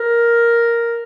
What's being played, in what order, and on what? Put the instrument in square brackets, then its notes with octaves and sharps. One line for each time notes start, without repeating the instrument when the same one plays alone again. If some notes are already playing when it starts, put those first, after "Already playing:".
Already playing: [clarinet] A#4